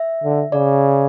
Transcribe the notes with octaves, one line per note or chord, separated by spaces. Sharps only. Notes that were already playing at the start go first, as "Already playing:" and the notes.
Already playing: E5
D3
C#3 D5